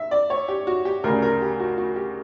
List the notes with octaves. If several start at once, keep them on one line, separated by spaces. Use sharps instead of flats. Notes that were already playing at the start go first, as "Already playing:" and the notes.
Already playing: E5
D5
C#5
G4
F#4
G4
D2 C#3 G3 A#4
A#4
G4
F#4
F#4
G4